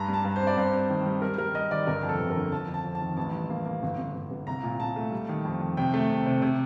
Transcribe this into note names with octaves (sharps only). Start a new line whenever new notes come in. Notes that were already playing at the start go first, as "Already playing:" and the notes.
Already playing: G2 A#5
G3
A5
G2
C4 C5
D5
G2 C5
C4
D#3
G3
G3 A#4
G3 A#4
G3 D#5
D#3 D5
G1 A#4
F2
A4
G1
A#4
D3
F2 A5
F2
A5
F2
A5
D#3
A1 A5
G3
A#3
A#3
G1
G1
G1
G1
C2 A#5
A#2
A#2 A5
A3
G3
D#3
F2
D#3
C3 G5
A3
C3
C3
C3